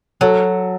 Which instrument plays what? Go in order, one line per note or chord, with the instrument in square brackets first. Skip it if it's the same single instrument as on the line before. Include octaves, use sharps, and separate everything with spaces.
[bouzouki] F#3 [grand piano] A4